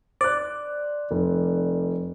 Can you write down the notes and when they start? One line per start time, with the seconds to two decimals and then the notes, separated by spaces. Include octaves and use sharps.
0.21 C5 D5 F#6
1.11 F1